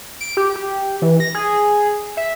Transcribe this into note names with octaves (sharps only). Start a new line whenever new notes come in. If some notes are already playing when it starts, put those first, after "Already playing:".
D7
G4
G4
E3
A#6
G#4
E5